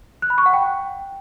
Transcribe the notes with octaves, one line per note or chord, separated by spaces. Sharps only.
F#6
B5
C#6
F#5
G5